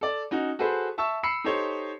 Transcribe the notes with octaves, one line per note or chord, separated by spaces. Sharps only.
A4 D5
C#4 D#4 F#4
F#4 G#4 A4 B4 C5
E5 A5 C#6 E6
B5 E6 C7 C#7
D#4 G4 A4 C5 C#5